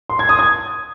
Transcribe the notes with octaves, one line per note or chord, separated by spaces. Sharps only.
C6
G#6
D#6
G#6